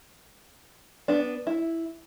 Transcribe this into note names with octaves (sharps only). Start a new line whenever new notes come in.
B3 D4
E4